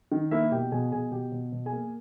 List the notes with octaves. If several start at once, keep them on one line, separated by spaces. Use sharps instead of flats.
D#3
A#3 E4 E5
B2 G4 G5
B2 G#4 G#5
B2 G#4 G#5
B2 G4 G5
B2
B2
G#4 G#5
A#3